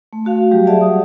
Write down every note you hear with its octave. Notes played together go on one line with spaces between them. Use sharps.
A3
A3 F#4 F5
F#3 G3 G4
G#4 D5 E5 F#5 A5
D#6